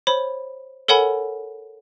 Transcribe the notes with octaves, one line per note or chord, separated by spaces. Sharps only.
C5 C#5 B5
A4 A#4 C#5 F#5 G#5 B5